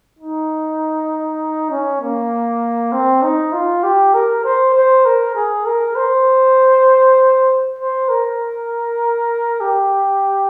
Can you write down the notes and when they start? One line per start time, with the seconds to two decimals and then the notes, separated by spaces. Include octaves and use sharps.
0.19 D#4
1.71 C#4
2.01 A#3
2.92 C4
3.23 D#4
3.53 F4
3.83 G4
4.14 A#4
4.44 C5
4.74 C5
5.05 A#4
5.35 G#4
5.66 A#4
5.96 C5
7.78 C5
8.09 A#4
9.61 G4